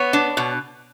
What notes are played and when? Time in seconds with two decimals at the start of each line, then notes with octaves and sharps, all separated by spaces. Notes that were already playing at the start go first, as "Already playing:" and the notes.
Already playing: B3 C#5
0.13 D4
0.37 B2